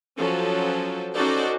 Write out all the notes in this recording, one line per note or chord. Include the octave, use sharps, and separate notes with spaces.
F3 F#3 C#4 A4
C#4 D#4 F#4 A4 C5 D5